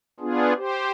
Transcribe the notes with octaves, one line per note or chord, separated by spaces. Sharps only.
B3 D4 F4 G#4
G4 C5